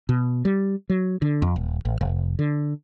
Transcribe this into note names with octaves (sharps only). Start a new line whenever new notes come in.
B2
G3
F#3
D3
F2
D#1
A1
F1
D3